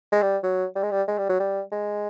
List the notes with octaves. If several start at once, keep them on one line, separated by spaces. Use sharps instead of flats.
G#3
G3
F#3
G3
G#3
G3
G#3
G3
F#3
G3
G#3